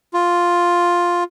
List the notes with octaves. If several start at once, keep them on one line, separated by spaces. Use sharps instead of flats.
F4